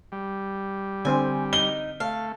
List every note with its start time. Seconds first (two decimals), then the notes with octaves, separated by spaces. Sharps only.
0.12 G3
1.05 D3 C4 C5 G#5
1.53 D#4 G7
2.00 A3 F5